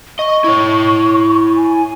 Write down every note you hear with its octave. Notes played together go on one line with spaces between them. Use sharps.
D#5 C#6
E4 C#5
G#5